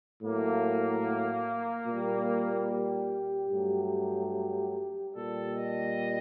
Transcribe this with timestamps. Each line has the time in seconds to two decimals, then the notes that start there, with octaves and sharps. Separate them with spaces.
0.23 A2 F#3 A3 A#3
1.87 A#2 G3
2.69 G4
3.50 G2 F#3 A3
5.13 A#2 G3 A4
5.54 D#5